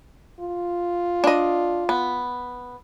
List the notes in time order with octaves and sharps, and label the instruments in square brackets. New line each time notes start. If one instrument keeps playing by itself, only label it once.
[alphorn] F4
[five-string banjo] D4 D#5
B3